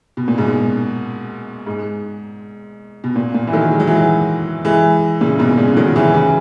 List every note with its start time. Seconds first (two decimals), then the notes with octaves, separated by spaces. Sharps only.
0.17 B2
0.28 A#2
0.38 G#2 B2
1.66 G#2
3.04 B2
3.16 A#2
3.34 A#2
3.47 E3
3.53 D#3 F#3
3.71 G#3
3.80 F#3
3.87 E3 G#3
4.65 E3 G#3
5.21 A#2 C#3
5.39 G#2 B2
5.58 A#2 C#3
5.76 D#3 F#3
5.96 C#3 E3
6.14 C#3 E3